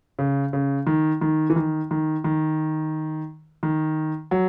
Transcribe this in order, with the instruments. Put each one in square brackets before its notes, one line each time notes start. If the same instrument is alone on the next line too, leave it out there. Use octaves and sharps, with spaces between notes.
[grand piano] C#3
C#3
D#3
D#3
E3
D#3
D#3
D#3
D#3
F#3